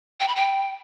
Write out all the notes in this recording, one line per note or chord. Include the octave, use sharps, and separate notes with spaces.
G5
B5
G5